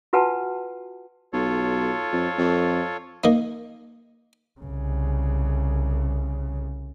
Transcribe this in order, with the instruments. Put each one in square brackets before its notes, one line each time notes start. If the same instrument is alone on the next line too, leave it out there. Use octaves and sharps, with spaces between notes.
[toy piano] F4 F#4 B4 F#5 G#5 A5
[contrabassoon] B1 [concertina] F4 A4 C#5
[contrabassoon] F2
F2
[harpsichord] A#3 D#4
[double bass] C2 C#3